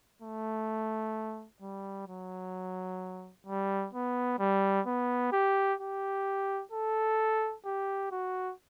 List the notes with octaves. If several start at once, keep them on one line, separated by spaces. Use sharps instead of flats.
A3
G3
F#3
G3
B3
G3
B3
G4
G4
A4
G4
F#4